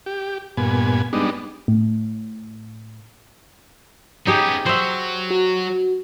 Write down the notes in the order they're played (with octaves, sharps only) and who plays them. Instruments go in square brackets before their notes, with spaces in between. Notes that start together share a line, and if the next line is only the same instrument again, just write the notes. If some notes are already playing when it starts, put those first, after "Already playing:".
[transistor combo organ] G4
G2 A#2 B3 G#5
G3 G#3 B3 D4 D#4
[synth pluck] A2
[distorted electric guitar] B3 C#4 [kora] D#4 G4 G#4
[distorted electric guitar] F#3 [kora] C5 E5
[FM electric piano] F#4